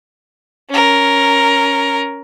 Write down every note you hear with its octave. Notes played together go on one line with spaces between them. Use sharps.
C#4 A#4